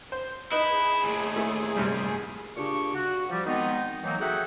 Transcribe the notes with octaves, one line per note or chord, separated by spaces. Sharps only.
C5
D#4 E4 G#4 B4 D#5
D#2 A2
A3 E4 A4
G2 C3 G3
A#2 C#3 D4 G4 C#6
F#4
F3 G3
D#3 G#3 B3 C4 D#4
D#3 E3 F#3 A#3 C4 D#4
F#4 G#4 A4 E5 F#5 G5